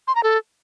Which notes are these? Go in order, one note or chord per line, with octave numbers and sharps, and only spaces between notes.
C6
A#5
A4